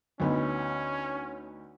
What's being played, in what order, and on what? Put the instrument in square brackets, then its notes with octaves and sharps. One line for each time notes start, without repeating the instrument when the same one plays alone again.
[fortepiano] D2 B3 D#4 [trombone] C#4